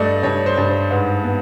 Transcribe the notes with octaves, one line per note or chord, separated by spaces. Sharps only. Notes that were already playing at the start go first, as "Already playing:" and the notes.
Already playing: G2 A3 D5 D#5
G2 C#5
C5
G2
C5
G#2 B4
B3